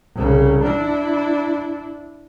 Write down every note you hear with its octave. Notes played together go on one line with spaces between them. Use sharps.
C2 C#3
D4 E4